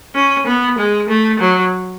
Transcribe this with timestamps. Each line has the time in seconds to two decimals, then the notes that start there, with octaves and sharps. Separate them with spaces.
0.15 C#4
0.47 B3
0.78 G#3
1.09 A3
1.39 F#3